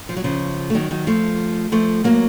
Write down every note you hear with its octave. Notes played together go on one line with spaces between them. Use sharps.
F3
F#3
C#3 F3
A3
D#3 F#3
D#3 F#3
F3 A3
F3 A3
F#3 A#3